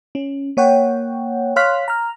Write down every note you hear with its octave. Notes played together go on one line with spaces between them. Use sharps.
C#4
A#3 C#5 F#5 G5
C#5 F5 C6 F6 F#6 B6
A#5 F6